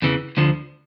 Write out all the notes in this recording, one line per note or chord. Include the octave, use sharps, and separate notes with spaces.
E2 C#3 E3
D2 D3 F3